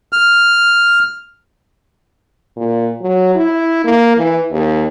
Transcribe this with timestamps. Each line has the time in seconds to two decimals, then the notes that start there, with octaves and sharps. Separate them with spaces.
0.13 F6
2.57 A#2
3.02 F#3
3.35 E4
3.84 A#3
4.17 E3
4.51 D#2